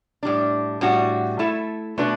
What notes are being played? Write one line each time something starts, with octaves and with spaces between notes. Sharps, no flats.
A2 G3 D4
A2 G3 D4 F#4
A3 E4 A4 E5
B2 A3 D4 F#4 B4